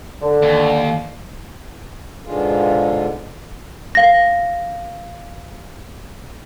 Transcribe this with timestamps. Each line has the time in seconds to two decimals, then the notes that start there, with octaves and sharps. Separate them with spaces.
0.21 D3
0.42 D#2
2.25 G#2 B2 D3 G#3 F4
3.95 F5 A#6